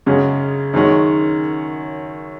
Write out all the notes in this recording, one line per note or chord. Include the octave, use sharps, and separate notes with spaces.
F#2 C#3 G#3 C#4
F#2 D#3 G#3 C#4